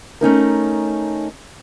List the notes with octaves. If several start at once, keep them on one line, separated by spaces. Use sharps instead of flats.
A3 C#4 D#4 A#4